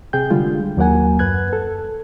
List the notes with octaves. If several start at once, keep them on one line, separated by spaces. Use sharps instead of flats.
C3 G#4 G5 G6
D3 G3 G#3 F4
D#2 F#3 A#3 A#4 F#5 G#5
F#2 B4 F#6 G#6
A4